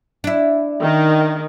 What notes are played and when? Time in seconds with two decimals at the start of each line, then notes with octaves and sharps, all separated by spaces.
0.24 D4 E4
0.81 D#3